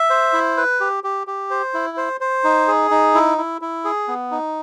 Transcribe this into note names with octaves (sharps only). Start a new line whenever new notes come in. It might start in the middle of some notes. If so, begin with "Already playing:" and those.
Already playing: E5
C5
E4
B4
G4
G4
G4
C5
E4
C5
C5
D#4
G#4
D#4
E4
E4
E4
G#4
B3
D#4